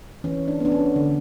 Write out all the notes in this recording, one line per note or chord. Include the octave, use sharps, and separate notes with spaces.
E3 C#4
D4
B3 D4
C#4
D3